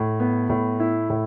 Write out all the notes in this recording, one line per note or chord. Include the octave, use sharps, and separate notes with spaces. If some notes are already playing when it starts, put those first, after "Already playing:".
Already playing: A2
B3
A2
E4
A2